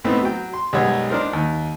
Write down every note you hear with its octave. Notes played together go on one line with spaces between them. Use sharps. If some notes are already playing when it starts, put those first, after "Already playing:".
A2 A3 B3 C4 D#4
F#3 G5
C6
B1 F#2 G3 G#3 C#5
D4 D#4 A#4 C5
D#2